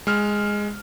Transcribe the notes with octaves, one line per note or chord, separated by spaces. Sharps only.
G#3 F6